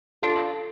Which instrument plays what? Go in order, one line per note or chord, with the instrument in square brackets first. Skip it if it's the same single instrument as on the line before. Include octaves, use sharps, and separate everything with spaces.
[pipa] D4 F4 [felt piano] A4